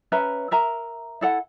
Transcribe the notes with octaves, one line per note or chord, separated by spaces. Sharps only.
C#4 B4 E5 A#5
A#4 E5 A#5
E4 A4 F#5